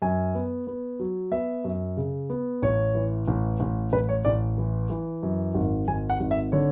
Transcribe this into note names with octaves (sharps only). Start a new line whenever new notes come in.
F#2 G#5
B3
B3
F#3
B3 E5
F#2
C#3
B3
A1 C#5
E3
A1
A1
A1 B4
C#5
A1 D5
E3
E3
F#2
G#1
G#1 G#5
F#5
G#1
E5
D3 C#5